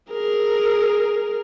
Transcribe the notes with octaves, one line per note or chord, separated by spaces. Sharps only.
G#4 A#4